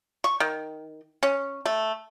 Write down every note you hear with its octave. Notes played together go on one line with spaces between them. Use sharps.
C#6
D#3
C#4
A3